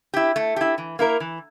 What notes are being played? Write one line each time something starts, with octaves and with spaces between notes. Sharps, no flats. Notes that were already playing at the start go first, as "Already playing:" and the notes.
E4 G4
A3
E4 G4
E3
A#3 E4 A#4
E3